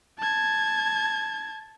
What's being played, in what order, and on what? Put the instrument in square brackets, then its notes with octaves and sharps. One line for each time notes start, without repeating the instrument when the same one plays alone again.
[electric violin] A5 G#6